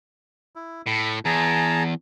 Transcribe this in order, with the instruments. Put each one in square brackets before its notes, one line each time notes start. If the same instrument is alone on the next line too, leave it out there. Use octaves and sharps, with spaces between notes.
[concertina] E4
[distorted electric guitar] A2 [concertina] B5
[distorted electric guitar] E2 [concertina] G#4 A5 A#5